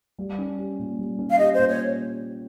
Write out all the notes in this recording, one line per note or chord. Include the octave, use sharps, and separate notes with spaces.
G3
C#4
G4
A#2
G3
C#4
F5
G4 D#5
A#2 C5
C#5